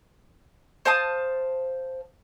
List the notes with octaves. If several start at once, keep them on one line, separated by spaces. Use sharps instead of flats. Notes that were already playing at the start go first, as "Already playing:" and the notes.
C5 F5 A5 D#6